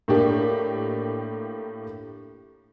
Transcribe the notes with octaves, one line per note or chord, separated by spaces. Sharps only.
A2 A#3 D4 G4